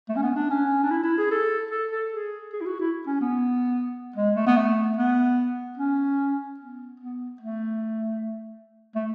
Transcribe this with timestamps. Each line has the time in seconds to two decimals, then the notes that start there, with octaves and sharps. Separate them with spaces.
0.09 A3
0.16 C#4
0.23 B3
0.36 D4
0.50 C#4
0.83 D4
0.91 E4
1.04 E4
1.18 G#4
1.31 A4
1.71 A4
1.91 A4
2.13 G#4
2.53 G#4
2.61 E4
2.66 F#4
2.80 E4
3.07 C#4
3.21 B3
4.16 G#3
4.36 A3
4.47 B3
4.56 A3
4.97 B3
5.78 C#4
6.60 B3
7.00 B3
7.41 A3
8.95 A3